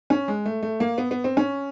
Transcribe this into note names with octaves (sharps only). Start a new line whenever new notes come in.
C#4
G#3
A3
A3
A#3
B3
B3
C4
C#4